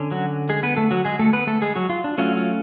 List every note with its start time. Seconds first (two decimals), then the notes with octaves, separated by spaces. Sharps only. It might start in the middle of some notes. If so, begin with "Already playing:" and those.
Already playing: D3 C#4
0.11 F#3 F#4
0.49 G#3 G#4
0.63 B3 B4
0.77 A3 A4
0.91 F#3 F#4
1.05 G#3 G#4
1.19 A3 A4
1.33 B3 B4
1.47 A3 A4
1.62 G#3 G#4
1.76 F#3 F#4
1.90 F4
2.04 D4
2.18 F#3 A3 C#4 F4
2.37 F4